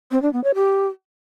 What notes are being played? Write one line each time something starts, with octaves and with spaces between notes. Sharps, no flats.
C4
D4
B3
C#5
G4